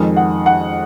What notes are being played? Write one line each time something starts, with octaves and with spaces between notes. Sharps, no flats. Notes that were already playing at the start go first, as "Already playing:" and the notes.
Already playing: F2 D#3 G#3
F#5
F#5